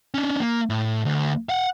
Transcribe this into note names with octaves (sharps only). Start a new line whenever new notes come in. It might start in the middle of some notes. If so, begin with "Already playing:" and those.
C#4 D4
A#3
A2
D2
F5 F#5